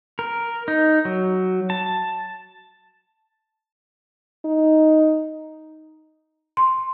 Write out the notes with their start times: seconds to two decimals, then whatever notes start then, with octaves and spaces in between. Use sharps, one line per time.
0.19 A#4
0.68 D#4
1.05 F#3
1.70 A5
4.45 D#4
6.57 C6